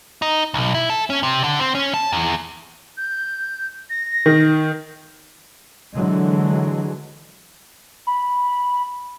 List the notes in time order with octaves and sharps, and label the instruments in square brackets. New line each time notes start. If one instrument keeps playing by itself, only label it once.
[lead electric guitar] D#4
B1
E4
A4
C#4
C3
D3
C4
C#4
A5
E2
[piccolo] G6
A#6
[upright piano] D#3
[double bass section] D3 E3 F#3 G#3
[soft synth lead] B5